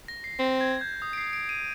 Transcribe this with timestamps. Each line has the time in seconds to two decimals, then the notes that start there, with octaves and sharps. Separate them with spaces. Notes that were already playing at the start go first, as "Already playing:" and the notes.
0.08 A#6
0.24 C7
0.39 C4
0.61 G#6
0.81 G6
1.02 D#6
1.13 D7
1.18 C7
1.33 D7
1.49 D#7